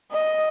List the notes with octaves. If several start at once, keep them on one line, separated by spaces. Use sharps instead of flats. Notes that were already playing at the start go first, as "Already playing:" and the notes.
D#5